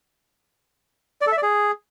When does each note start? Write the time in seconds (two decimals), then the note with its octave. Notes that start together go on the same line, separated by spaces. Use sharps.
1.21 D5
1.27 A4
1.32 E5
1.37 D5
1.43 G#4